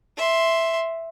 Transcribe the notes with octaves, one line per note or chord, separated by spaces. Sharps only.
E5 C6